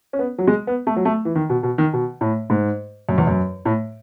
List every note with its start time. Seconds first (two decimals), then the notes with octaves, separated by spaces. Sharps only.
0.13 C#4
0.19 B3
0.38 F#3
0.48 G#3
0.67 B3
0.87 A3
0.96 F#3
1.05 A3
1.25 E3
1.35 D#3
1.50 B2
1.63 B2
1.78 D#3
1.93 B2
2.21 A2
2.50 G#2
3.09 F#2
3.18 E2
3.27 F#2
3.65 A2